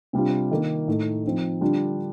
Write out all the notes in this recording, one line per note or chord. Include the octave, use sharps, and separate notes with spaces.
C3 G3 D4 F4
D#3 A#3 D#4
A2 A3 D#4
F3 C4 D#4
D3 G3 D4 F4